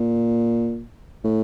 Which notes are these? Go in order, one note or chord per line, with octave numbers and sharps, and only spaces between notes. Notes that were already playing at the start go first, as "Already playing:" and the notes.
Already playing: A#2
A2